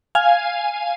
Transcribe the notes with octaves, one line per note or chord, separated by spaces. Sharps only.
F5 G#5